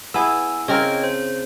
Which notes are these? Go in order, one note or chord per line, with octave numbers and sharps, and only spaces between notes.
B3 E4 G#4 G#5 E6
C#3 C4 A#4 C#5 D#5 G5
C5